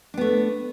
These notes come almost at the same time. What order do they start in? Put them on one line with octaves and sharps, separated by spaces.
D4 B3 A3